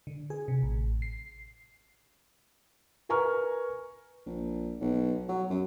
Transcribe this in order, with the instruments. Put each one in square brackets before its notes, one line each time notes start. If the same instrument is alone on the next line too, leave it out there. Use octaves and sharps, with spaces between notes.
[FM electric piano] D3
G#4
C3
A1
C7
[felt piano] A#4 B4 G#5 A#5 C#6 F6
[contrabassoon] A#1
B1
F#3
F#2